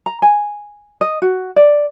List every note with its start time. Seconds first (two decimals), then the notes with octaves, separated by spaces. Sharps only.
0.06 A#5
0.22 G#5
1.01 D#5
1.22 F#4
1.56 D5